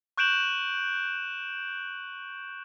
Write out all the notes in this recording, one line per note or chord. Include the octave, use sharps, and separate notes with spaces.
C#6 F#6 G6 D7 E7 F#7